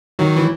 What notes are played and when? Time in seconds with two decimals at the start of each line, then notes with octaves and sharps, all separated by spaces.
0.19 D#3 F#3
0.36 E3